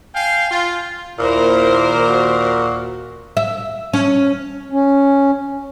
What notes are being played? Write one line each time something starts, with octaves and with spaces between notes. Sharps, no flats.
F5 G5 G#5
F4
D#2 A#2 E4 A#4 C5
F#4
E5
C#4
C#4